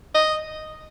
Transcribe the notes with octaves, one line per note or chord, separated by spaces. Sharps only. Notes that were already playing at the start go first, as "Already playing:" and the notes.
D#5